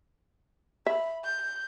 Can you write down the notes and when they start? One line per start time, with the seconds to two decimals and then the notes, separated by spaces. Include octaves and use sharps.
0.87 E5 B5
1.24 G6